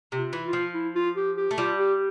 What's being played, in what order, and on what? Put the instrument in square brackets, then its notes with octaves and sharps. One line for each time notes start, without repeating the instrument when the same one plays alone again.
[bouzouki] C3
[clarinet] F4
[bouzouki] E3
[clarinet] F4
[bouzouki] F3
[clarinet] E4
F4
G4
G4
[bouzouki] A3
[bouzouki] G3 [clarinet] F4
[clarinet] G4